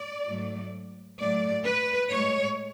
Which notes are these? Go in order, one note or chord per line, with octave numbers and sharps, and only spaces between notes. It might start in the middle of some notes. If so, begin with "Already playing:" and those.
Already playing: D5
G#2 F#3 A3
A2 F#3 A3 D5
B4
A2 G#3 C#5